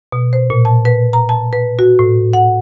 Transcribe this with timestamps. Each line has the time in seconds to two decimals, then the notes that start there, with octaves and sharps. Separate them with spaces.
0.12 B2
0.33 C5
0.50 A#2
0.65 A5
0.85 B4
1.13 A#5
1.29 A5
1.53 B4
1.79 F#4
1.99 A2
2.33 F#5